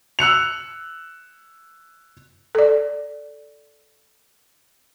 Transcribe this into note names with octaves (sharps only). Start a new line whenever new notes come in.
E6 F#6 C#7 F7
A4 D5